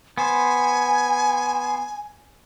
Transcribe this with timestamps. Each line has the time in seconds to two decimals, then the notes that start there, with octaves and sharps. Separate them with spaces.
0.18 B3 C5 G#5